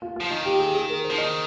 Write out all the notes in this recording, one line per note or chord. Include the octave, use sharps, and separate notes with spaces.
F4
F4
F3
D#3 D#4
G4
G#4
G#4
A#4
C5
F3
D#3 D#5